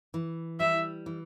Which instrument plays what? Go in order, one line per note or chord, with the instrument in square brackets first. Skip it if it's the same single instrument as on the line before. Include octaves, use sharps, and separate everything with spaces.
[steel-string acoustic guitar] E3
[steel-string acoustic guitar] G3 [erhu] E5
[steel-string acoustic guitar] E3